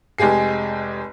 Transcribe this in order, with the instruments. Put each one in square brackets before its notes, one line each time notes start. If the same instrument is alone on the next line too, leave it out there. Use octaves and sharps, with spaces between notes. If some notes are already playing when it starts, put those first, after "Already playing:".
[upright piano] F1 G#3 G4 G#4 C7